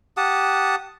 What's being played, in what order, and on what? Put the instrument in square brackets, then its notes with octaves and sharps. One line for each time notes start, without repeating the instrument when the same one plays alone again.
[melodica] G4 F#5 A5 D#6